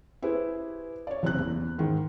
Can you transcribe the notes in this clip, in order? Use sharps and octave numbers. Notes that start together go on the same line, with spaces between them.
E4 G4 G#4 B4 C5
C#5 D5
F#1 C3 C4 F#6
E2
G#2 D#3